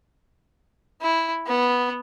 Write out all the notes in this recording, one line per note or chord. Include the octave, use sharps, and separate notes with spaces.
E4
B3